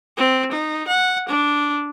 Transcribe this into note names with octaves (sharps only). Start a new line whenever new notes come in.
C4
D#4
F#5
D4